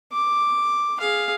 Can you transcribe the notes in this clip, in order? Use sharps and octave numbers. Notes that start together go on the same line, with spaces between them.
D6
G#4 F5